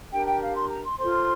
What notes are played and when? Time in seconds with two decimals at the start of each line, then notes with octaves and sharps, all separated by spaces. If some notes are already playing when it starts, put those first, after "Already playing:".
0.11 D4 G4 A#4 G5
0.26 G5
0.40 F5
0.55 C6
0.70 A#5
0.84 C6
0.98 F4 A4 C5 C6